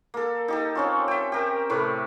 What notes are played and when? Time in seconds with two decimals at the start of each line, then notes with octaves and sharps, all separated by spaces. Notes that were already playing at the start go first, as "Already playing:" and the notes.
0.14 A#3 A4
0.48 D#4 G4 A4
0.75 C4 C#4 F4
1.08 E5 G5
1.32 G4 A#4
1.70 A2 C3 A3 B4